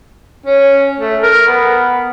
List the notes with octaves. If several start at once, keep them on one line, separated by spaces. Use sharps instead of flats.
C#4
A3
A#4
B3